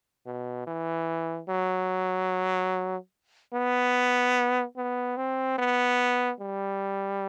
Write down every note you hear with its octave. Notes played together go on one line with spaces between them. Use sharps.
B2
E3
F#3
B3
B3
C4
B3
G3